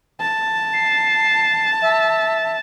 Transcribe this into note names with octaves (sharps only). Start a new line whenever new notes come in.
A5
C7
E5